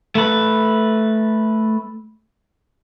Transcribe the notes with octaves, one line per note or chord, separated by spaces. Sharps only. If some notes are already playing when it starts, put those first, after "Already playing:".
A3 B4